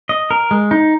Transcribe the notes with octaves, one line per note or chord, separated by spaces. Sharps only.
D#5
A#4
G#3
D#4